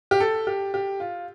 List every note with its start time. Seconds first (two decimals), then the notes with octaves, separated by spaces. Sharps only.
0.11 G4
0.20 A4
0.47 G4
0.74 G4
1.00 F4